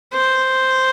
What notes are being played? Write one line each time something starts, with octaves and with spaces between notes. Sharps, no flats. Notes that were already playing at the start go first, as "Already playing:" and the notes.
C5